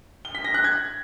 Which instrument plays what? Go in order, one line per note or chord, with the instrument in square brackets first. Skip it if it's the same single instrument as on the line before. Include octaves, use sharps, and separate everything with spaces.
[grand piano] G7
B6
A#6
F#6
G#6